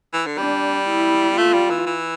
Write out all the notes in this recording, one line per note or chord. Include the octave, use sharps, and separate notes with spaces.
E3
D3
G3 D4
E4
A3 F4
G3
E3
E3